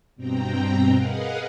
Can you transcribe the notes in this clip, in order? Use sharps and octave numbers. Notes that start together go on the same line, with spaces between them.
G2 B2 C4 G5 A#5
G#4 A#4 B4 D#5 F5 F#5